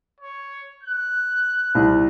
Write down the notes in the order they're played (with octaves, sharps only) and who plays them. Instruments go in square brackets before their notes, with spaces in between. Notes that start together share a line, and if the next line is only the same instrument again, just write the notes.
[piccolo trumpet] C#5
F#6
[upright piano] C2